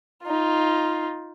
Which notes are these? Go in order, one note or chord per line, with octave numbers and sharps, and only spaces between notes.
D#4 F4